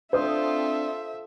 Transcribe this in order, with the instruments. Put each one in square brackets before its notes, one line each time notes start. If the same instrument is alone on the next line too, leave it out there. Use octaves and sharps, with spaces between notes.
[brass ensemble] C4 D4 [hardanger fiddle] F4 A4 [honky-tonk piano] C5 D#6 [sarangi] E5